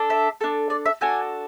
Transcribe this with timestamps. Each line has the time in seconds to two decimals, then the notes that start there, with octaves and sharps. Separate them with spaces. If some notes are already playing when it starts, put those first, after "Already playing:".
Already playing: D4 A4
0.10 E5
0.41 D4 A4
0.70 D5
0.86 E5
1.01 D4 F#4 A4 G#5